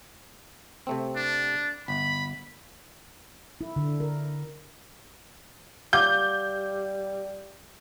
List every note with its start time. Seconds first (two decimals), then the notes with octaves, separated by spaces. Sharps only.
0.87 C3 A3 C4
1.16 D4
1.88 G1 B5
3.61 E4
3.76 D3
4.00 A#4
5.93 G3 F5 F#5 D6 G6